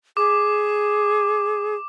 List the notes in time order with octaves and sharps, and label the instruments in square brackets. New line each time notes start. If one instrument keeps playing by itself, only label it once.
[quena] G#4 [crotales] D6